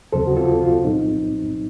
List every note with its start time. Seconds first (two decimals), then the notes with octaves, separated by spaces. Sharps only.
0.13 D#2 C#3 F#3 C4 A4 C5
0.27 F#4
0.37 F4 A4
0.61 F4
0.84 C2 A#2 F#3 C4 D#4